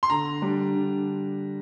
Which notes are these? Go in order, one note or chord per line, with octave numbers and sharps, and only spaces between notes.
C6
D3 A#5
G3 D4
D3